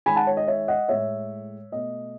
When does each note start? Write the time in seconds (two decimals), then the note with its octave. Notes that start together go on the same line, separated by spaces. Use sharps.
0.06 D#3 G#3 G#5 B5
0.16 F#5 A5
0.27 C#5
0.37 D#5
0.47 C#5 E5
0.68 D#5 F#5
0.89 A2 G#3 C#5 E5
1.72 B2 A3 D#5